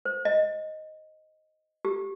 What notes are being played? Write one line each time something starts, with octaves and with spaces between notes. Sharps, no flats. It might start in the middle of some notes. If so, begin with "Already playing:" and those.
C5
D#5
G4